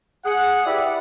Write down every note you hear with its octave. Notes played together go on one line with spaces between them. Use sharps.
G#4 F#5
E4 G4 B4 D5 B5